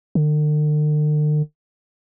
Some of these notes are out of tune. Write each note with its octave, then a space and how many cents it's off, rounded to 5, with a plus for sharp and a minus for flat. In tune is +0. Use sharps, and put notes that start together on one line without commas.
D3 +45